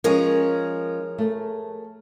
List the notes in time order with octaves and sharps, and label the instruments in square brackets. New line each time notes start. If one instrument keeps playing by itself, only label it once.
[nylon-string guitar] F3 G#3 C#4 [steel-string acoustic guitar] G#4 A#4 C#5
[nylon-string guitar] A3